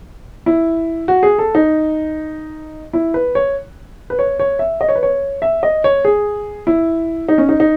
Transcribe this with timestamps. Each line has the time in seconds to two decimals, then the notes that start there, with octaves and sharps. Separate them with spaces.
0.46 E4
1.08 F#4
1.23 G#4
1.39 A4
1.55 D#4
2.93 E4
3.14 B4
3.35 C#5
4.10 B4
4.19 C#5
4.39 C#5
4.59 E5
4.81 D#5
4.89 C#5
4.95 B4
5.03 C#5
5.42 E5
5.63 D#5
5.84 C#5
6.05 G#4
6.67 E4
7.29 D#4
7.38 C#4
7.49 D#4
7.60 D#4